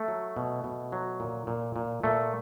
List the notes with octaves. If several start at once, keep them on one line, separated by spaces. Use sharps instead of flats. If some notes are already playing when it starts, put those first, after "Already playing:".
Already playing: A3
F#3
B2
B2
F#3
A#2
A#2
A#2
A#2 A3